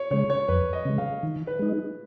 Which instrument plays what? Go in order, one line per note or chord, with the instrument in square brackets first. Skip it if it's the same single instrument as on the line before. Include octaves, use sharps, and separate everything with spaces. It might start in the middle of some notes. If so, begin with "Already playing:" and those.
Already playing: [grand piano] C#5
[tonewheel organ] C#3 G#3 [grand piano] C#5
[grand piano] C#5
[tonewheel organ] F2 [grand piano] B4
[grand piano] D#5
[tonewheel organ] C#3 G#3
[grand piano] F5
[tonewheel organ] D#3
[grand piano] B4
[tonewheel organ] G#3 D#4